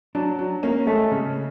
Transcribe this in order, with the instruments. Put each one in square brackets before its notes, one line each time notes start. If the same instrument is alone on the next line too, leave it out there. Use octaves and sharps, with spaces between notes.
[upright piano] F#3 [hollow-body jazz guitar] D4
[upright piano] F#3
[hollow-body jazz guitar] A#3 [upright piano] C#4
[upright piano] G#3 [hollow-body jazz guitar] A3
[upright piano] C#3